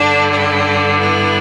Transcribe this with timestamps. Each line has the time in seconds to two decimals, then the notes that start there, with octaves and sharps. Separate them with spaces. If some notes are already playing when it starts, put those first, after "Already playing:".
Already playing: G2 D3 D4
0.31 D4 G4
0.98 B3 E4